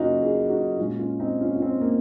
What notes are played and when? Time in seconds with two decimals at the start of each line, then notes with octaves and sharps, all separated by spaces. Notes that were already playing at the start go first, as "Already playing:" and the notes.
Already playing: F#2 C#3 A#3 C#4 D#4 F4 F#4
0.22 F4 G#4
0.49 D#4 F#4
0.77 A#2 G#3 C#4 F4
0.99 C#4 F4
1.20 C4 D#4
1.41 C#4 F4
1.56 F4
1.62 C4 D#4
1.81 A#3